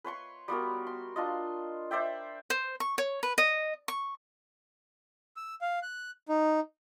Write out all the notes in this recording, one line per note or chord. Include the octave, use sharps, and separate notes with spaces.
B4 C#5 C6 C#6
G3 B3 F#4 A#4
C6
D4 F4 D#5
C5 D5 E5 G5
C5
C#6
C#5
B4
D#5
C#6
E6
F5
F#6
D#4